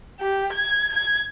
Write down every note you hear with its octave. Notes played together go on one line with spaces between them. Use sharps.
G4
G#6
G#6